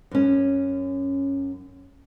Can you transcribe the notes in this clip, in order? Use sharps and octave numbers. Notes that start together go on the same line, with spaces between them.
F#2 C#4